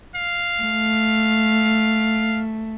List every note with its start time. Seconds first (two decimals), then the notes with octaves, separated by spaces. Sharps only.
0.16 F5
0.61 A3